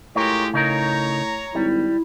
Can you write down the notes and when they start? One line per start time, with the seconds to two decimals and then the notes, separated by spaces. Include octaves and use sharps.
0.15 A2 G#3 F4 G4 A#4 C#5
0.54 C#3 D#4 A#4 C#5 A#5
1.55 G#1 G3 E4